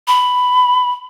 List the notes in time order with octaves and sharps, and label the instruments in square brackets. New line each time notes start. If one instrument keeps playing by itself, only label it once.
[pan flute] B5